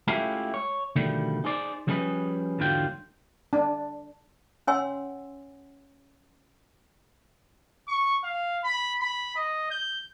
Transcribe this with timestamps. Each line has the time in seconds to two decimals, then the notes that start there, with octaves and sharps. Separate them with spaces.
0.07 G#3 A3 C#4 E4 F4 G4
0.54 C#5
0.96 B2 D3 D#3 F3 G3 A3
1.44 D#4 G#4 C5 D5
1.87 F3 G3 C#4 G#4 B4 D#5
2.59 E2 G#2 D3 F#3 F4 G5
3.53 D4
4.67 C#4 C#5 F#5 G#5 C6 E6
7.88 C#6
8.24 F5
8.64 B5
9.01 B5
9.36 D#5
9.71 G6